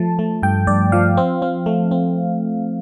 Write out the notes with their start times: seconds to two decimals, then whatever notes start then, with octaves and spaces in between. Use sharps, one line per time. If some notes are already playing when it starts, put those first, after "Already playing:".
Already playing: F3 A3 A5
0.19 A3
0.42 G2 G5
0.67 G2 D5
0.92 F3 F5
1.17 C4
1.42 C4
1.66 A3
1.91 C4